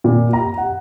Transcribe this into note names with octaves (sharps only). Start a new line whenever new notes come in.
A#2
A#5
F#5